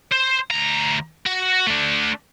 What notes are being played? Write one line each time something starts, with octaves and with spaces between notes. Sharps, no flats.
C5
D2 A#5
F#4
A3 D4